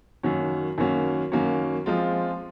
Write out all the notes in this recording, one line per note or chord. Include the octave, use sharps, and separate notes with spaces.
F#2 D#3 A#3 C#4 F#4
F#2 D#3 A#3 C#4 F#4
F#2 D#3 A#3 C#4 F#4
F3 G#3 C4 F4